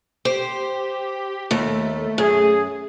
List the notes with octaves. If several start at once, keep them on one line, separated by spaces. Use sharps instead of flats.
G4 C5
D#2 A3
F#2 G#4